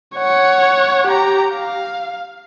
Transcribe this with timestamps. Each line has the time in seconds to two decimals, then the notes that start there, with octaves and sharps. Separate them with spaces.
0.16 C#5 F#5
1.07 G4 A#5
1.53 F5